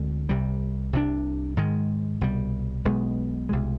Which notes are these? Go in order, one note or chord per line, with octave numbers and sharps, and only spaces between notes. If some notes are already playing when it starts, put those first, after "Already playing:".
Already playing: D2 D3 G#3 C4
C2 C3 G3
C2 C3 G3 D4
G#2 D#3 G#3
C2 B2 G3
B1 B2 G#3 B3
C2 B2 G#3